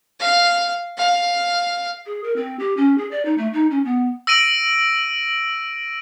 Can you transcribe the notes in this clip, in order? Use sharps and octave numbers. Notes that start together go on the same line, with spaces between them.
F5
F5
G#4
A#4
C4
G4
C#4
G#4
D5
D#4
A3
D#4
C#4
B3
E6 A#6 D7 D#7 F#7